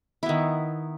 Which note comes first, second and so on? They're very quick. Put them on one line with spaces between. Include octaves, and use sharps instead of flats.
E4 B3 D#3